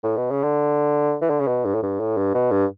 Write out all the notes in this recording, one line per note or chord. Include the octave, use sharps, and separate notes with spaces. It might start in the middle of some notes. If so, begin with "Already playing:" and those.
A2
B2
C#3
D3
E3
D3
C#3
B2
G2
A2
G2
A2
G2
B2
G2